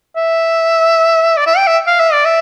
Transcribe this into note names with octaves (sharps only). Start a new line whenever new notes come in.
E5
D5
E5
G5
E5
F5
E5
D5
E5